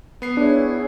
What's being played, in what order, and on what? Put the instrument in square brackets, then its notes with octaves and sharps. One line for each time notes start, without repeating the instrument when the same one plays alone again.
[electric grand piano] B3 C7
[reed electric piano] D4 [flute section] E4 G#4 C#5